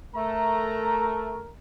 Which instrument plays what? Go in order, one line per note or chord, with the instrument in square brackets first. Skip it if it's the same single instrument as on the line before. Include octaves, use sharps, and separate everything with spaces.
[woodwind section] A3 [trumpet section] A#4 [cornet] A#5